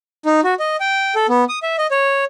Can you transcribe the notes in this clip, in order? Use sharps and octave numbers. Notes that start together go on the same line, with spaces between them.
D#4
F#4
D#5
G5
A4
B3
D#6
E5
D#5
C#5